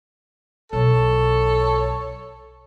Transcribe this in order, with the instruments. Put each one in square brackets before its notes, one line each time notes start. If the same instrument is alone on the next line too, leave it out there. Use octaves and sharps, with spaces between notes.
[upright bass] B1 [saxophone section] A4 C#5